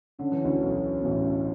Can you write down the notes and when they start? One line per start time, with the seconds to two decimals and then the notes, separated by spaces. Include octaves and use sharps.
0.19 D3 C#4
0.32 E3
0.44 D2 D3
0.62 B1 B2
1.01 B2
1.05 A1 A2